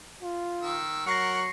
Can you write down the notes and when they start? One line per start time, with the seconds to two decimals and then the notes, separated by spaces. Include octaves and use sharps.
0.23 F4
0.63 D#3 E6
1.06 F#3 A#4 F#5 C#6 A#6 C7 C#7